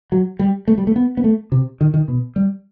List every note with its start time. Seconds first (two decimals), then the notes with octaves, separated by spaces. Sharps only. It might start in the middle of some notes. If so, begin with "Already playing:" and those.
0.12 F#3
0.39 G3
0.68 A3
0.78 G3
0.87 A3
0.96 B3
1.17 B3
1.24 A3
1.52 C3
1.81 D#3
1.94 D#3
2.08 B2
2.36 G3